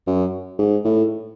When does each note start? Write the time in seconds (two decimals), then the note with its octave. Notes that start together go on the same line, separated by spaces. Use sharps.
0.07 F#2
0.59 G#2
0.85 A2